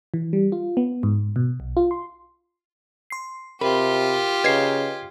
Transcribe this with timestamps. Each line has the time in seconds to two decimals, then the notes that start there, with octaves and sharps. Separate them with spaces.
0.14 E3
0.33 G3
0.52 F4
0.77 B3
1.03 G#2
1.36 B2
1.60 B1
1.77 F4
1.91 C6
3.10 C6 C7
3.61 C3 F4 G4 A#4 B5
4.44 C#3 B4 D#5 G#6 C7